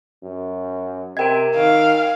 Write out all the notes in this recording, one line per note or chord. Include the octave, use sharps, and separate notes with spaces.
F#2
C3 A#4 D#5 G5 G#6 D7
D#3 F5